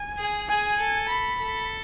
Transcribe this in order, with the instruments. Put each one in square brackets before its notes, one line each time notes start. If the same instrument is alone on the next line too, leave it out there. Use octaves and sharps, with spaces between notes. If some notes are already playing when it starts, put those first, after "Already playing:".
Already playing: [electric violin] G#5
[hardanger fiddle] G#4
[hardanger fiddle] G#4 [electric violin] G#5
[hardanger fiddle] A4
[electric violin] B5
[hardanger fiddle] A4